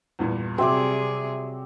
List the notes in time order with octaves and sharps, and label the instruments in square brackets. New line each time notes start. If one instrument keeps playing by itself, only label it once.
[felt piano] E2 G2 A#2
[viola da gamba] C3 G3 G#4 [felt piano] F#3 E5 D6 [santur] C4